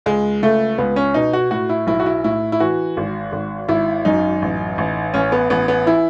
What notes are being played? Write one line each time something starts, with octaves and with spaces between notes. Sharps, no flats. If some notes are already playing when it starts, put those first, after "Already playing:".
C#2 G#3
C#2 A3
C#2 B3
C#4
B2 D#4
F#4
A2 F#4
E4
B1 E4
F#4
E4
A2 E4
E4
E3 F#4
G#1
G#1
G#1 E4
F#2 D#4
A1
A1
A1 C#4
B3
A1 B3
B3
E3 E4